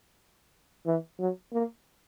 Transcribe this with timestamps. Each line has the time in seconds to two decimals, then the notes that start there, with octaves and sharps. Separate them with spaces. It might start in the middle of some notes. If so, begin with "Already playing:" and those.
0.86 E3
1.19 F#3
1.53 A#3